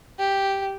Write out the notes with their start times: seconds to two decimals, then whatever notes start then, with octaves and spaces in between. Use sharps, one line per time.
0.19 G4